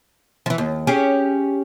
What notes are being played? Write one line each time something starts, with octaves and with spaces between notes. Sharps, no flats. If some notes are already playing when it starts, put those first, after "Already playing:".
E3 F3
D#2
C#4 G4 G#4